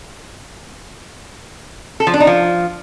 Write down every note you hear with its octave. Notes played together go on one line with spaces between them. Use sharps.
A4
F3
D4
D#4
F3